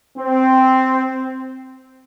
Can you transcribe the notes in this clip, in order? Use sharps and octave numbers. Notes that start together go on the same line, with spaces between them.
C4